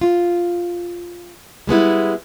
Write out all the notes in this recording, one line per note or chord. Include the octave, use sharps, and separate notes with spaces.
F4
G3 G#3 B3 E4